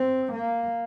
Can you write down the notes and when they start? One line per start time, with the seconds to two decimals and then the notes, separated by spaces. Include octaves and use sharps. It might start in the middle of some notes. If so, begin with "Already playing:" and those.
Already playing: C4
0.33 A#3